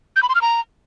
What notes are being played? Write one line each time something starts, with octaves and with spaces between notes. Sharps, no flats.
G6
B5
C6
F6
A#5